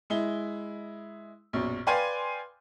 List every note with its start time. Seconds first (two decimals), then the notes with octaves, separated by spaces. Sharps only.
0.10 G#3 E4 G7
1.53 A#1 F#2 B2
1.87 B4 D5 F5 G5 G#5 C6